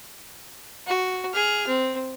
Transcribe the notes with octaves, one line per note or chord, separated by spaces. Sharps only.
F#4
G#4 F6
C4